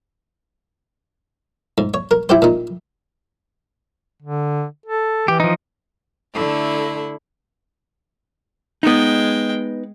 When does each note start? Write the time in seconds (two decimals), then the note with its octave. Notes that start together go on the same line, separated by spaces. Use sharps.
1.78 G#2
1.94 C#5
2.11 A#4
2.29 E4 G4 C5
2.42 A#2 D#4
4.22 D3
4.86 A4
5.28 E3 G4
5.40 F3 D#4
6.34 D3 A3 E4
8.83 G#3 B3 D#4 G5